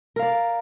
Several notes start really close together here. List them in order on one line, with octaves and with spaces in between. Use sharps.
A#4 F5 D5